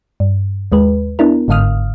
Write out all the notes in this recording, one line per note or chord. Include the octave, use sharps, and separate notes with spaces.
G2
D#2 G#3 B4
B3 D4 E4 A#4
G1 G#2 D3 F5 D#6 F6